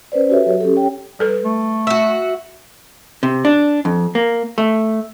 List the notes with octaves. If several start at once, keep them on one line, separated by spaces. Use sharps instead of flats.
C#4 B4 C5 D5
F#4 G4 A4 B4 C#5 E5
F#3 F#4
C#4 G4 A4
C#5 G5
G3 A4 B4
A3
F#4 E5
C3
D4
F2
A#3
A3